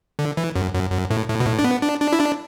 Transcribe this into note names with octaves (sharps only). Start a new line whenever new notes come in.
D3
E3
F#2
F#2
F#2
A2
A2
B2
A2
D4
B3
D4
D4
E4
D4